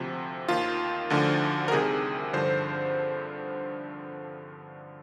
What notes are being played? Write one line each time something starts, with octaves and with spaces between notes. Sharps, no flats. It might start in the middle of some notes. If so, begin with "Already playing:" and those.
Already playing: D2 C3 F3
D#2 D#3 F4
D2 D3 F3
A#4
C2 C3 D#3 G#4
G2 D3 F3 C5